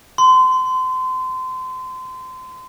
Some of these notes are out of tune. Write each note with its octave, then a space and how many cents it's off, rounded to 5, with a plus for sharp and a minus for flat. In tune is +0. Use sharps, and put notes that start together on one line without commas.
C6 -30